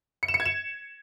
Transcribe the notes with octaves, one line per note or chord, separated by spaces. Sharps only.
C#7
E7
C#7
G#6
E7